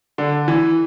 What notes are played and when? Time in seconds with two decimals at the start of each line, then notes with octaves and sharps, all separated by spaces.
0.18 D3
0.48 E3